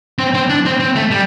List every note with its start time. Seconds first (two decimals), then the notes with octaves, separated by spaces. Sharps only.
0.19 C4
0.34 C4
0.49 D4
0.65 C4
0.80 C4
0.96 A3
1.11 G3